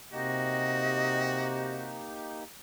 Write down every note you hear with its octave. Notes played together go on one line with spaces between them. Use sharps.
C3 A#3 D#4 F#4 G4 D#5